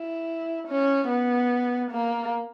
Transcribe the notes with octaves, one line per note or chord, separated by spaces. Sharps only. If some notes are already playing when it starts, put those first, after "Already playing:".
Already playing: E4
C#4
B3
A#3